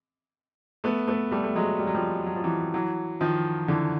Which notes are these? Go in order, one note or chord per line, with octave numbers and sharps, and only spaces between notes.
A3 B3
A3 B3
G3 A3
A3
F#3 G#3
G3
F#3
F3 G3
F#3
F3
E3 F#3
E3 F#3
D#3 F3
D3 E3